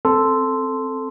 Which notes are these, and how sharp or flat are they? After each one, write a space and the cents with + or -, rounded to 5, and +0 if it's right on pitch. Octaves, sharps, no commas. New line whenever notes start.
C4 +0 A4 +0 C6 -10